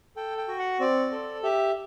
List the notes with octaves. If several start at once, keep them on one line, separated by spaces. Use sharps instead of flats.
A4 G5
G5
F#4
F#5
C4 D5
A4
G4 E5